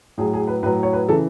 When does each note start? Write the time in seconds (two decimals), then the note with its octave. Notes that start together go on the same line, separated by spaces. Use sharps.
0.18 A2 F#3 G#4
0.33 G#4
0.47 B4
0.63 A2 B4
0.66 F#3
0.83 C#5
0.93 B4
1.09 C#3 E3 A4